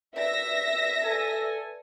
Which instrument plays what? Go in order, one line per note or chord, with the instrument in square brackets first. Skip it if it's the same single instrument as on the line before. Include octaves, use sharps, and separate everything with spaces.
[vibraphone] B4 D5 [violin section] E5 A#6
[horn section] A4 G#5